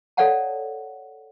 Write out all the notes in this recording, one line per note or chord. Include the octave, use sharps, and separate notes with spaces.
A4 C#5 D5 F5 F#5 A5